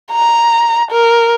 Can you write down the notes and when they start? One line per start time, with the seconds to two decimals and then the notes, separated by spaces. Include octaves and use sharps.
0.12 A#5
0.91 A#4